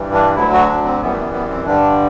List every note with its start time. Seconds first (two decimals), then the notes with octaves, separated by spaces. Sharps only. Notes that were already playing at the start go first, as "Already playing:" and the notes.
Already playing: G2 E3 G3
0.13 D4
0.36 D2 D3 F#3 E4
0.53 F#4
0.69 D4
0.84 C4
1.02 F#2 E3 G3 B3
1.13 A3
1.18 B3
1.33 B3
1.49 C4
1.66 G2 D3 G3 D4